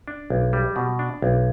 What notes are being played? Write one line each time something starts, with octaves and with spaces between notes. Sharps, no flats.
D4
B1
G3
B2
D4
B1